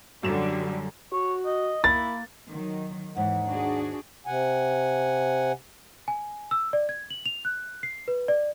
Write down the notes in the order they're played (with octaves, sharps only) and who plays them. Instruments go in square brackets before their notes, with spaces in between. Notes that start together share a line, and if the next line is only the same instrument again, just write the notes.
[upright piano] F#2 E7 [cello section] D3 F#3 G3
[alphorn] F#4 [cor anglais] C#5
[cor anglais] D#5
[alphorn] A#3 [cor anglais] E4 [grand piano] A6
[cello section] D#3 F#3
[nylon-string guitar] D#2 G#2 [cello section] E3 [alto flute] F#5
[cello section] D4 F#4 G#4
[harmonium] C3 F#5 G#5
[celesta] G#5
E6
D5
G#6
F#7
F7
F#6
C7
B4
D5